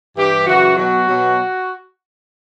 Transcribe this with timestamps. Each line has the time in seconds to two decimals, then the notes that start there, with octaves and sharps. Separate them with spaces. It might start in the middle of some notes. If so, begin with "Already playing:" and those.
0.16 G2 E3 G4
0.46 F#2 C#3 E3 F#4
0.77 B2 F#3 F#4
1.07 B2 F#3